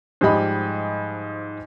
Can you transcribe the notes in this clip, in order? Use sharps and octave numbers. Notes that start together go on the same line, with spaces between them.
G#2 F3 G3 G4 D#5 B5